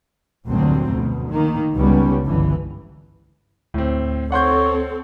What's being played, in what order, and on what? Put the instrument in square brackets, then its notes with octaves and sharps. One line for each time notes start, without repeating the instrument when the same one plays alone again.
[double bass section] F1 D2 G2 A#2 F#3 C4
D2 B2
D#3 A#3
C#2 G3 B3 C#4
G1 C2 G2 D3 E3
[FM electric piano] D2 [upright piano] A2 C4
[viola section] C4 A4 [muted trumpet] C#5 [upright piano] F#5 C6 G6